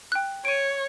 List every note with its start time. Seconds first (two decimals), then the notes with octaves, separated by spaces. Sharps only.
0.12 G5 F#6
0.45 C#5 D7 D#7